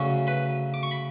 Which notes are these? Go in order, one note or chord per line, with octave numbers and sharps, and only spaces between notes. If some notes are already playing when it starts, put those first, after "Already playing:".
Already playing: D2 C#3 F#3 C#4
B4 B5
D6
C#6
B5